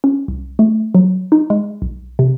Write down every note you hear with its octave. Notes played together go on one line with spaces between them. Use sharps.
C#4
C2
A3
F#3
D#4
G#3
B1
C3